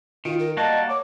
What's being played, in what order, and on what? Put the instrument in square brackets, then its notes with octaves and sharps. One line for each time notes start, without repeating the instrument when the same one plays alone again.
[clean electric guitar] D#3 [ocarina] F4
[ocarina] A#4
[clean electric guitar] G3 A#3 F#4 [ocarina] D#5 [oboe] A5
[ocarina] C#5 [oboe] D6